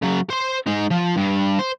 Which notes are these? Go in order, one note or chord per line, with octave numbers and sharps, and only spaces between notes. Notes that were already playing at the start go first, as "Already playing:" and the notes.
C#3 F#3
C5 C6
G#3 D#4
F3
G2
C5